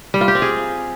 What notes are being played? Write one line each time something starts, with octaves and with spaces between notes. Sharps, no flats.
G3
F4
G4
C4
G#4